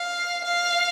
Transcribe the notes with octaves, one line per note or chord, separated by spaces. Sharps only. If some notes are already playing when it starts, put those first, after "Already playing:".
Already playing: F5
F5